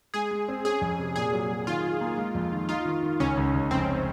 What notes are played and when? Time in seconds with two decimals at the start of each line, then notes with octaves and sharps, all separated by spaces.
0.14 G#3 G#4
0.31 G#3
0.48 C4
0.65 C#4 G#4
0.81 F2
0.99 C3
1.16 A#2 G#4
1.32 F#3
1.50 F#3
1.67 D#3 F4
1.84 D#3
2.01 A#3
2.17 G#3
2.35 F2
2.52 D#3
2.69 D#4 F4
2.85 D#3
3.03 D#3
3.20 C#2 C#4
3.37 C#2
3.54 C#2
3.70 F1 C4